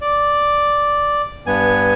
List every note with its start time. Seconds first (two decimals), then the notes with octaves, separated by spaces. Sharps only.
0.01 D5
1.46 G2 B3 G#5